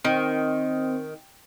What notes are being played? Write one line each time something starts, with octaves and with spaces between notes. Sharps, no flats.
D#3 C4